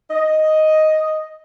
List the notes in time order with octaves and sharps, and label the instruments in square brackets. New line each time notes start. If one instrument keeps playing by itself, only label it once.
[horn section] D#5